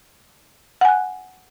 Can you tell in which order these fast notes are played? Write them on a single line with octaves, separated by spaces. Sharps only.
F#5 G#5 F#6